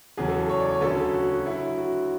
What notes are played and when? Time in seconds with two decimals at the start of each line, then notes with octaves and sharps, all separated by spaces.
0.17 E2 C#3 F#3 G#4
0.28 A4
0.49 C#5
0.60 D5
0.71 C#5
0.81 D2 C#3 F#3 A4
1.13 F#4
1.30 F#4
1.46 D2 D3 F#3 E4
1.78 F#4